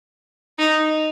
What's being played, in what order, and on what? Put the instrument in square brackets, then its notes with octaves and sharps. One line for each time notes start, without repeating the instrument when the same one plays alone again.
[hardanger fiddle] D#4